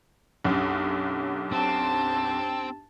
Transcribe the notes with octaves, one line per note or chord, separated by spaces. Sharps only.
B1 F#2 D4 G4
C4 A5